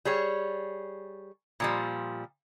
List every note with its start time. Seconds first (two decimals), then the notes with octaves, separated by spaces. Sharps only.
0.05 G3 G#4 C#5
1.60 A#2 F3 G3